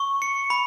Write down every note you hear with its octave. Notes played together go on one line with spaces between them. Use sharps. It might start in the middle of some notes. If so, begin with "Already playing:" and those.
Already playing: C#6
C#7
B5